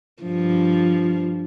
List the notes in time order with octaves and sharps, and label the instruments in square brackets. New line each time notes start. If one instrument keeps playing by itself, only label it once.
[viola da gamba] G2 F3